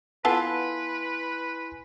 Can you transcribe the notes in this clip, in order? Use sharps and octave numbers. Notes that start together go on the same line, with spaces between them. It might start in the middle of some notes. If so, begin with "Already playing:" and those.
B3 E4 F4 A4 B4 G#5 C6